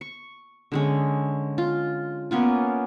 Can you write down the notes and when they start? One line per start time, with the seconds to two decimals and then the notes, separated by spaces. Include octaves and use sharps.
0.01 C#6
0.72 D3 G#3 C#4
1.58 F4
2.31 A#3 B3 C#4 F4